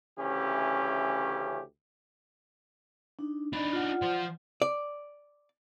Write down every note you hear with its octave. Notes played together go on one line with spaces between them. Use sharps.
D2 C#3 E3 C#4 G4
D4 D#4
D4 D#4 B5
F4 D5 F#5
F3 C5
D5